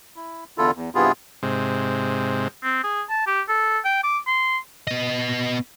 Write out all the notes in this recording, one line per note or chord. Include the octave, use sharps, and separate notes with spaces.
E4
E2 D3 E4 F4 A4
E2
G2 C3 B3 E4 F4 G#4
G#2 C3
C4
G#4
A5
G4
A4
G5
D6
C6
B3 D#5